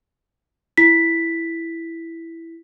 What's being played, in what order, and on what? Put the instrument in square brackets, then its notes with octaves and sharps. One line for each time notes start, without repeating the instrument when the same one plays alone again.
[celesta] E4 B6